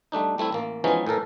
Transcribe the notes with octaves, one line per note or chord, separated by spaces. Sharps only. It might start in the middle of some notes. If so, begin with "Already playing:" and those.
G3 A3 D4 D#4
G3 A3 C4 E4
A1 A#3
E3 F3 G#3 B3 C#4 D#4
A2 E3 A4 A#4